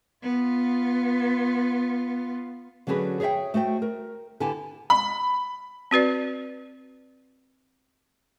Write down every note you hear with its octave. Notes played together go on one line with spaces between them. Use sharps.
B3 F4
D3 F#3 C#4 F#4 G#4 B4
G#4 C#5 D5 E5 G5
A3 F#4 C5 G5
A#4
D3 B3 E4 G4 G#5 A5
B5
C4 F#4 B4 D5